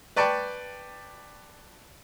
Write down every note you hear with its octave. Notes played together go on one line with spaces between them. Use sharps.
B4 D5 G5 A5 C#6